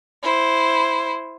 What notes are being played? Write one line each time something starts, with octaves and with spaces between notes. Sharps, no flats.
E4 C5